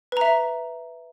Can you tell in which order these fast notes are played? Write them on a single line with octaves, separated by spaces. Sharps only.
B4 A#5 E5